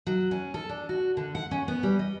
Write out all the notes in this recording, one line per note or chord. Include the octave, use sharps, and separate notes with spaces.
F#3
C#4
A4
D4
F#4
D3
F#5
C#4
B3
G3
D#5